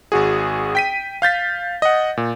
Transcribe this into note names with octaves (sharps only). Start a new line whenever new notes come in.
G#1 F#4 G#4
G5 B6 D#7
F5 G6 A6 B6
D#5 F#5
A#2